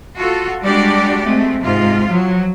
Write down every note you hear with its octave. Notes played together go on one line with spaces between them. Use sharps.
F4 F#4 A4
G3 G#3 D4 F#4 G4 D5
G#3 A3 C4
G#2 C3 F4
F3 F#3